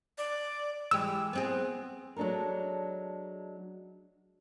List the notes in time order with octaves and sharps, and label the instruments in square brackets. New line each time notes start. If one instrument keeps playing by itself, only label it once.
[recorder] D5
[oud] E3 G#3 G4 [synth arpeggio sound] E6
[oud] B3 C4 G#4
[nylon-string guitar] F#3 G#3 D4 A4 A#4